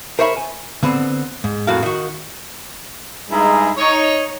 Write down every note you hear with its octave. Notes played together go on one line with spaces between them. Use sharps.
A#4 C5 C#5 E5 G5 B5
G#5
D3 B3 C4
G#2
F2 A2 F#4 A#4 F5
D#3 F#4
G2 G#3 D#4 E4 G#4 A#5
D#4 C#5